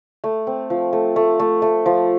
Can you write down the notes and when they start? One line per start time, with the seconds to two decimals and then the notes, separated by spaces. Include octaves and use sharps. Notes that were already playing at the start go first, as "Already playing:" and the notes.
0.24 A3
0.47 C4
0.70 F3
0.93 A3
1.16 A3
1.40 A3
1.62 A3
1.86 F3